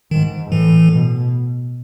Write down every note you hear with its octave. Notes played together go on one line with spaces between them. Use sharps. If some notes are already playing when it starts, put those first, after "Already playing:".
G#2 D#3
A2 E3
B2